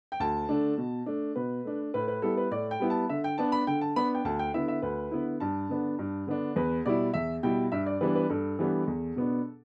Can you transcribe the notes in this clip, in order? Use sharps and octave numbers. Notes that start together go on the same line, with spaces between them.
G5
D2 A5
D3 A3 D4
B2
A3 D4
B2 B4
A3 D4
A2 B4
B4
G3 B3 E4 A4
B4
A2 D5
G5
G3 B3 E4
A5
D3 E5
G5
B3 D4 A5
B5
D3 G5
A5
B3 D4 B5
G5
D2 A5
G5
D3 B3 E4 E5
E5
D2 B4
D3 B3 E4
G2 A5
D3 B3 D4
G2
D3 B3 D4
E2 B4
B2 G3 E4 D5
E2 E5
B2 G3 E4 G5
G2 E5
D5
E3 G3 B3 D4 B4
B4
G2 A4
E3 G3 B3 D4
E2
B2 B3 D4